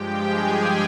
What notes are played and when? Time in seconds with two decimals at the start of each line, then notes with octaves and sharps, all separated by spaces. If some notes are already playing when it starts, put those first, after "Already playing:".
Already playing: G2 F3 G#3 G4 G5
0.26 G#4 G#5